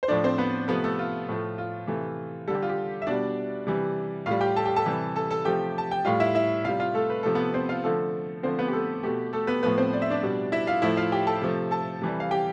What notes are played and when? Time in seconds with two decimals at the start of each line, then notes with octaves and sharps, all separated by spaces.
0.03 C5
0.08 A2 F3 A3 D4 D5
0.24 C4 C5
0.38 B3 B4
0.68 C3 F3 A3 B3 B4
0.84 A3 A4
0.99 F4
1.29 A2 F3 A3
1.58 F4
1.87 C3 E3 A3
2.47 G3 A4
2.50 D3 G4
2.62 F4
2.69 G4
3.02 E5
3.07 B2 G3 D4 D5
3.67 C3 E3 G3
4.26 A2 G3 F4 F5
4.41 G4 G5
4.56 A4 A5
4.65 G4 G5
4.76 A4 A5
4.86 C3 E3 G3
5.16 A4 A5
5.30 A4 A5
5.45 C3 F3 A3 G4 G5
5.78 A5
5.91 G5
6.05 A2 G3 F4 F5
6.20 E4 E5
6.35 E4 E5
6.64 C3 G3 F4 F5
6.80 F4 F5
6.94 A3 A4
7.10 B4
7.23 C3 F3 A3 A4
7.35 B3 B4
7.54 C4 C5
7.69 F4 F5
7.84 D3 F3 A3 A4
8.43 D3 F3 A3 C4 C5
8.59 B3 B4
8.68 G4
8.73 A3 A4
9.03 B2 A3 G4
9.33 A3 A4
9.47 B3 B4
9.63 A2 F3 A3 B3 B4
9.78 C4 C5
9.93 D5
10.02 E5
10.10 D4 D5
10.23 B2 G3
10.52 E4 E5
10.67 F4 F5
10.82 A2 F3 A3 E4 E5
10.97 F4 F5
11.12 G4 G5
11.27 A4 A5
11.42 C3 F3 A3
11.71 A4 A5
12.02 C3 E3 G3
12.20 F5
12.31 G4 G5